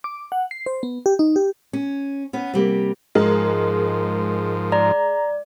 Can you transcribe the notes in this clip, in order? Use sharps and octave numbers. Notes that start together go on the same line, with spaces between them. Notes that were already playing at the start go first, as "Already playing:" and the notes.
D6
F#5
C7
C5
B3
G4
D#4
G4
C#4
B3 C#4
C3 G3 A#3
G#2 F3 G#3 A#4
D5 A#5